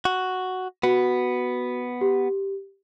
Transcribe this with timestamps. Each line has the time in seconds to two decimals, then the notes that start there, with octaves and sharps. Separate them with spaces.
0.05 F#4
0.83 B3 F#4
2.01 G4